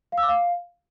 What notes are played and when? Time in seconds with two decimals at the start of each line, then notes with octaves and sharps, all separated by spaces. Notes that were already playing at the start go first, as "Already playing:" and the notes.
0.12 F5
0.18 E6
0.23 D6
0.28 F5